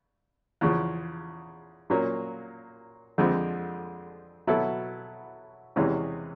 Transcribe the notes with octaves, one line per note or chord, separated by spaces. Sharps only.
E2 C#3 F3
A#2 F#3 A#3 C#4
F2 D3 F3 G#3 C4
B2 F#3 B3 E4 A4
E2 C3 E3 G#3 C#4